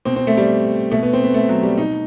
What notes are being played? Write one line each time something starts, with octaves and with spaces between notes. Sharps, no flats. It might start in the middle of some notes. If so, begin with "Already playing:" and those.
B2 C4
C4
A3
G3
B2 A3
B3
C4
B3
A3
F#3
G3
B2 D#4